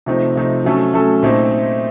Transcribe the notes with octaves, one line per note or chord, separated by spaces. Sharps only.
C3 F3 A3 C4 D#4
C3 F3 A3 C4 D#4
F#3 A3 C#4 A4
F#3 A3 C#4 A4
A#2 A3 C4 D#4